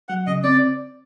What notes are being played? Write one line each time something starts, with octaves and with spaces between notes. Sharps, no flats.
F#3 F#5
C#3 D#5
C4 D5